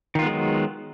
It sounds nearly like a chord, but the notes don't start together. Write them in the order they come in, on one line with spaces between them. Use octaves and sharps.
D#3 F4 B3 G#3 F#3